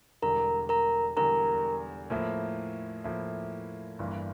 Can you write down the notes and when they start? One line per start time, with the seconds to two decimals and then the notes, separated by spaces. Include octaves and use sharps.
0.22 E1 E2 D3 G3 A#4 A#5
0.69 A#4 A#5
1.16 E1 E2 D3 G3 A#4 A#5
2.10 A2 F3 A#3 E4
3.04 A2 F3 A#3 E4
3.99 G1 G2 E3 A#3